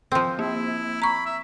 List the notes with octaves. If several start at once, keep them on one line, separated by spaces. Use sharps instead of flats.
F3 C4
A#3 E4
A#5 B5 C#6
E5